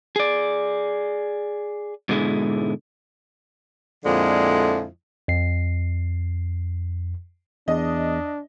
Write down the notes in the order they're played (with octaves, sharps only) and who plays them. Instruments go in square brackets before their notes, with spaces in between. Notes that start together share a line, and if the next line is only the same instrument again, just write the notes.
[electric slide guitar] G#4 D5
G#2 B2 D3 G#3 E4
[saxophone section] F2 A#2 D3 F3 G#3 E4
[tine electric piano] F2 C7
[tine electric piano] E2 [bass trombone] D4 [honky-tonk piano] D#5